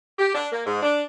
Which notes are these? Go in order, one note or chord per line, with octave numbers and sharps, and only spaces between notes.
G4
D4
A#3
G#2
D4